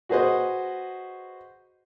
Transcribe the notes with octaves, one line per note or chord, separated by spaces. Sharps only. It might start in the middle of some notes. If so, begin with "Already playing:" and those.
F#4 G#4 B4 C5 D#5 F#5